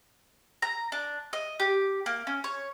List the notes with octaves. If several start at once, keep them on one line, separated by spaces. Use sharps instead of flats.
A#5
D4
D#5
G4
A#3
C#4
C#5